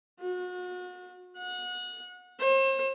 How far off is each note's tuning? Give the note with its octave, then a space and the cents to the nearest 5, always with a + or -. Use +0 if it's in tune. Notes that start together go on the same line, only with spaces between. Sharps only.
F#4 -35
F#5 -30
C5 +40